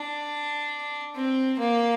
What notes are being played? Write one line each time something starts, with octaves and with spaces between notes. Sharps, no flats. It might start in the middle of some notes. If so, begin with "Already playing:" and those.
Already playing: D4
C4
A#3